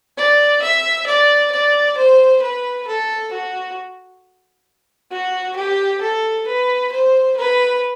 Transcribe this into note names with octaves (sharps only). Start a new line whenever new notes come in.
D5
E5
D5
D5
C5
B4
A4
F#4
F#4
G4
A4
B4
C5
B4